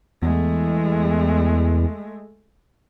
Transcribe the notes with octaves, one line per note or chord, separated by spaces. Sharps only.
E2 G#3 A3